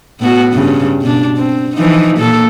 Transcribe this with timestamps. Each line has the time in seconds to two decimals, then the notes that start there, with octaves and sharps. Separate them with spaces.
0.20 A2 B3 F#4
0.53 G2 C#3
1.01 B2 D4
1.37 C4
1.76 E3 F3 D#4
2.18 A#2 A#3 A4